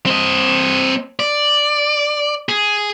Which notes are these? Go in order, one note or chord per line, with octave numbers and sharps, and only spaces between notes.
C4 D#5
D5
G#4